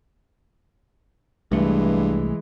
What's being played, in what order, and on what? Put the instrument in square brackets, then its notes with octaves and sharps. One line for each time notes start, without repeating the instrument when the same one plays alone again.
[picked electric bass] C2 A3 [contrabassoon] G2 [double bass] E3 G#3